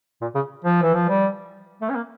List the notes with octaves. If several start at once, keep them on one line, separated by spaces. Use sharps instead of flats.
A#2
C#3
F3
E3
F3
G3
A3
C#4
A#3